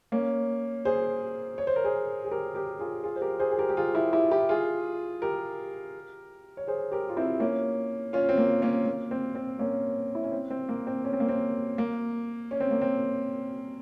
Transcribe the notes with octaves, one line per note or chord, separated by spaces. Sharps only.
A#3 C#4
G#4 C5
C#5
C5
A#4
G#4 C5
G#4
G4 A#4
G4 A#4
F4 G#4
F4 G#4
C5
G4 A#4
G#4 C5
G#4
G4 A#4
G4
F4 G#4
E4 G4
E4 G4
E4 G4
F4 G#4
G4 A#4
C#5
G#4 C5
G4 A#4
F4
C4 E4
A#3 C#4
C#4 F4
C4
A#3
A#3 C#4
A#3
C4
C4
A#3 C#4
E4
C#4
C4
C4
A#3
C4
C#4
C4
A#3
C4
A#3
C#4
C4
A#3
C4